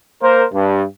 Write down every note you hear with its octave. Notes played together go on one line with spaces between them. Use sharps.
A#3 A#4 C5
G2